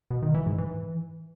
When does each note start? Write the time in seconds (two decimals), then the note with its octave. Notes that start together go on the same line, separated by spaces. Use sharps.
0.11 B2
0.22 D#3
0.34 E3
0.46 G#2
0.58 E3